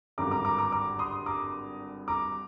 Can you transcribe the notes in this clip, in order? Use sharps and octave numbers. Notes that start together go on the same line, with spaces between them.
G#1 G2 D3 A#5 D6
A#5 D6
A#5 D6
A#5 D6
A#5 D6
C6 D#6
A#5 D6
A#5 D6